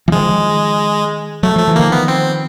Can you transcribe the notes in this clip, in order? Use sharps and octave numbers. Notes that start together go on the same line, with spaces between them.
E3
D#3 F3 G#3
F#3 A3
F3 A3
E3
D#3 F3 A#3
B3
C4